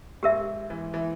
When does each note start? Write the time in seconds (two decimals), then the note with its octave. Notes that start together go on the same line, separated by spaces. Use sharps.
0.23 G#2 G4 A#4 E5
0.70 E3
0.94 E3